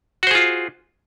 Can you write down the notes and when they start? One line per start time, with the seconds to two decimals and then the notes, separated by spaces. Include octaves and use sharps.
0.23 F#4
0.27 C5
0.31 G#4
0.35 F4